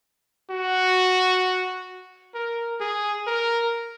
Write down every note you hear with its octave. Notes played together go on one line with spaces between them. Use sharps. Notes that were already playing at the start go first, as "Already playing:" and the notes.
F#4
A#4
G#4
A#4